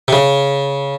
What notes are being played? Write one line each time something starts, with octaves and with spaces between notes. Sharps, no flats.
C3
C#3